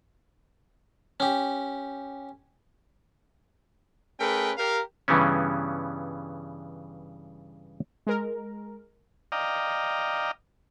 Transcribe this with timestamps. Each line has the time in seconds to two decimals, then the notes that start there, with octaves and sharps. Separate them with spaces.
1.20 C#4 G4
4.20 A3 C#4 G#4 A#4 B4 G5
4.58 G4 A#4 F5
5.08 G2 C#3 E3 G3 B3 C#4
8.07 G#3 A#4
9.32 D5 D#5 F5 G5 A#5